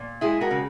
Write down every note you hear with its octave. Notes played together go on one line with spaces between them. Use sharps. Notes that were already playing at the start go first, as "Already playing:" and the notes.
Already playing: A#2
G#3 E4 G#4
F#4 A#4
C#3